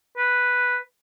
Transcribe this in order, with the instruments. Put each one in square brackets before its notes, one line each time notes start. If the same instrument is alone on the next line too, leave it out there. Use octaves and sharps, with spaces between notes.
[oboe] B4